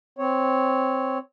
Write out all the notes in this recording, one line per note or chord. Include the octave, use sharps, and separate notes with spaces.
C4 C#5